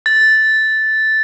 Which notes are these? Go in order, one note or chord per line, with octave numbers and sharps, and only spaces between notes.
A6